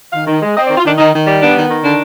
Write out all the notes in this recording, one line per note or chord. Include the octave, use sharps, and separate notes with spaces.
D#3 F5
D#3
G#3
C4 D#5
D5
D#3
F4
D#3 D4
D#3 D#4
D#3
G3
B3 D4
D#3
D#3
D3 D4